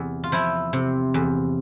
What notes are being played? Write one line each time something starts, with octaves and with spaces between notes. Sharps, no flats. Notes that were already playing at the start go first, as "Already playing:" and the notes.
Already playing: E2 C3
F4
F3 E4
C3
E2